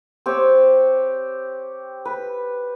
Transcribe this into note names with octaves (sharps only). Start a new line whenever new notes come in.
C4 G4 C#5
B4